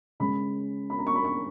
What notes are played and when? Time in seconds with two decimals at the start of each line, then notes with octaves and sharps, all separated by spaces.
0.20 C#3 G#3 B5
0.90 B5
0.99 A#5
1.07 C#6
1.15 B5
1.25 C#6